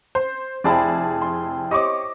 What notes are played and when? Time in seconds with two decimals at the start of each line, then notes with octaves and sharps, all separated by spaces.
0.15 C5
0.64 F1 C4 E4 G#4 D5 A5
1.22 C6
1.71 G4 C5 C#5 D#5 C#6 D6